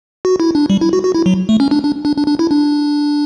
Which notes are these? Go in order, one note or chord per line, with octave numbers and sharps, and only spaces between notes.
F#4
E4
D4
G3
E4
F#4
F#4
E4
F#3
A3
C#4
D4
D4
D4
D4
D4
E4
D4